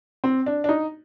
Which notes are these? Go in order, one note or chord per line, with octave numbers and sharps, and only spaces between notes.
C4
D4
D4
D#4